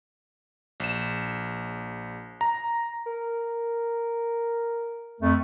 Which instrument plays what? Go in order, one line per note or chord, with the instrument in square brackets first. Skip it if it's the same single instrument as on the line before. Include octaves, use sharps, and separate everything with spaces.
[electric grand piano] A#1 E7
A#5
[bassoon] A#4
[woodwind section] F2 A3